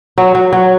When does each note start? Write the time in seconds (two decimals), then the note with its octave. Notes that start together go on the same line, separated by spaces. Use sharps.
0.18 F#3
0.35 F#3
0.53 F#3